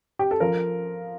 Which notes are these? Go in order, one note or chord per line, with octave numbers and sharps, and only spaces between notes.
G4
A4
F3 A#4